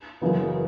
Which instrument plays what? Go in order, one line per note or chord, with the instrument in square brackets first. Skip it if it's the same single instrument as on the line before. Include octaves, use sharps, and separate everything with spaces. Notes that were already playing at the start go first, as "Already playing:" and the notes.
[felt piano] F#1 F#2 C#3 E3 B3